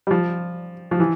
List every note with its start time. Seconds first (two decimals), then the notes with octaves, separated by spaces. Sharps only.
0.07 G3
0.11 F3
0.91 F3
1.00 E3